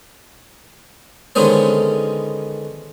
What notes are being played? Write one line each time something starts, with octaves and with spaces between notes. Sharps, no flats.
D3 D#3 G#3 B3 C#4 C5